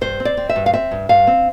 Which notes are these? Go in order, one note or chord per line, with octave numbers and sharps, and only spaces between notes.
G2 C5
C4
D5
C4
E5
G2
F5
C4 E5
G2
G2 F5
C4